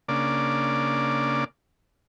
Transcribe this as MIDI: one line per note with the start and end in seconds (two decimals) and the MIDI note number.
0.09 1.44 49
0.09 1.44 58
0.09 1.44 62
0.09 1.44 74